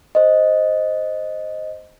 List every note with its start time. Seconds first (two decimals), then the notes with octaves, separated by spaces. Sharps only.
0.15 C5 D#5